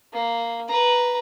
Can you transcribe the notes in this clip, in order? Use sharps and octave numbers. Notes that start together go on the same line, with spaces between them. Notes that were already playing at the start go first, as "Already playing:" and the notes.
A#3
B4 A#5